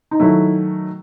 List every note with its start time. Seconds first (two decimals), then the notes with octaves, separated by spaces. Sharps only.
0.11 D#4
0.20 D#3 F#3 A3 E4